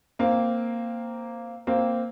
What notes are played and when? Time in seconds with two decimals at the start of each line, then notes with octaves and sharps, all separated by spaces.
0.19 A#3 C4
1.67 A#3 C4